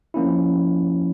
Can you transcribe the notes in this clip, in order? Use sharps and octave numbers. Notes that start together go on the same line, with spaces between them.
F3 A#3 C#4 E4